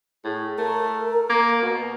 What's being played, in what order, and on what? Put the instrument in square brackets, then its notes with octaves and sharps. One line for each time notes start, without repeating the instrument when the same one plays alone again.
[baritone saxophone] A2 [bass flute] G#4
[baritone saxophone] A3 [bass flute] A#4
[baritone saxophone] A#3
B2